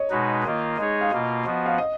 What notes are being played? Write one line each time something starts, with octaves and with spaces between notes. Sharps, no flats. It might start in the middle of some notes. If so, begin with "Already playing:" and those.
Already playing: C#5 D#5
B2 G#3 D#4 F#4 B4
D#3 A#3 F4 D#5
G#3 D#4 G#4 C#5 D#5
F5
B2 A#3 F4 D#5
F3 B3 F#4 D#5
F5
D#5